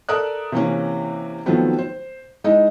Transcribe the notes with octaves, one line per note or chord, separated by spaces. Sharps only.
A4 A#4 D5 E5 D#6 F#6
C3 E3 A#3 C#4
D#3 F3 F#3 A3 B3 C4
C5
G#3 D#4 E4 D#5